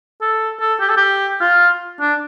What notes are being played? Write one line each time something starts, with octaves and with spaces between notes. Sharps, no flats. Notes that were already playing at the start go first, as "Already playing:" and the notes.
A4
A4
G4
A4
G4
F4
D4